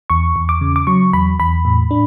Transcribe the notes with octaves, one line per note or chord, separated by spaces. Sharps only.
E2 C#6
E2
D6
C#3
D6
F#3 C#6
E2 B5
E2 B5
A2
D4